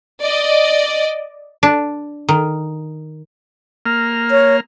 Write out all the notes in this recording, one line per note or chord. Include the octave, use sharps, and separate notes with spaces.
D5 D#5
D4
D#3
A#3 F6
C#5